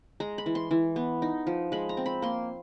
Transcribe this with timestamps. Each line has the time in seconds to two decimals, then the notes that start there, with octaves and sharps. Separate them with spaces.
0.20 G#3 A#5
0.38 B5
0.46 E3
0.55 C6
0.71 E3
0.96 B3
1.22 D#4
1.47 F3
1.72 G#3 B5
1.89 A#5
1.97 C4
2.06 B5
2.22 A#3 C6